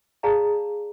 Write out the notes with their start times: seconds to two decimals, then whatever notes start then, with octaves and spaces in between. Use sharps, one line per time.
0.23 G#4 D5 F5 A5 A#5